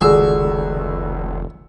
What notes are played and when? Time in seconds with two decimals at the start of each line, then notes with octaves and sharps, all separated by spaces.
0.01 F1 C#2 D#3 F#4 G#4 A4 D5 E6